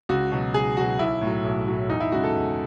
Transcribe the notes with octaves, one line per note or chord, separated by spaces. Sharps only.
C#2 F#4
B2 F#3
C#2 G#4
B2 F#3 F#4
B1 E4
A2
F#3
B1
A2 F#3
E2 D#4
E4
C#3 G#3 F#4
A4
E2